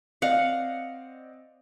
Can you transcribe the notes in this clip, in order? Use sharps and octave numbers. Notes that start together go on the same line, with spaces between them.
C4 D5 D#5 F5 F#5